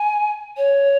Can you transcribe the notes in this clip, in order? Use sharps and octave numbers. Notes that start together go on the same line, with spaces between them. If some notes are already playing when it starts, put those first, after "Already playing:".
Already playing: G#5
C#5